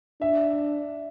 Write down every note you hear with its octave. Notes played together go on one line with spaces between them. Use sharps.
D4 E5